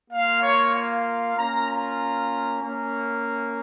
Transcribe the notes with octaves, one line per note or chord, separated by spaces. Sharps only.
A#3 F4 F5
C#5
F5
A#3 C#4 F4 A#5
A#5
A#3 C#4